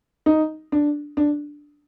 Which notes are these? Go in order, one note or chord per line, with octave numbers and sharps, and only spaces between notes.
D#4
D4
D4